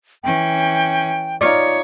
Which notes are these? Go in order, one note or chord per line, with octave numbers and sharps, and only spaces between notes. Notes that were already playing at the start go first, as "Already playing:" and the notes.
E3 C#4 G5
D#4 F4 C#5 D5